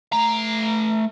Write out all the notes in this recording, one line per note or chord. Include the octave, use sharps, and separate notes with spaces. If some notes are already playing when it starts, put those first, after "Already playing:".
A3 A#5